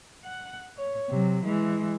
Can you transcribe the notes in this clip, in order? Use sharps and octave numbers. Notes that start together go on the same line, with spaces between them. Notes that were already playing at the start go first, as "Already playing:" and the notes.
F#5
C#5
C3 F#3
E3 G#3